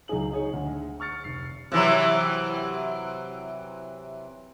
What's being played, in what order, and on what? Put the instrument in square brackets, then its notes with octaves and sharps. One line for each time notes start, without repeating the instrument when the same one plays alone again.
[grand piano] C#2 F#3 D#4 G#4 F#7
D#4 G#4 C#5
D2
C#6 F6 A6 C#7
F1 C7
[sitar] C3 E3 F#3